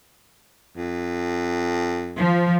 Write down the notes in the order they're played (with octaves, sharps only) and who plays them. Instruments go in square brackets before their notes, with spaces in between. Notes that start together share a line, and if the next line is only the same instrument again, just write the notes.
[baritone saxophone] F2
[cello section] F3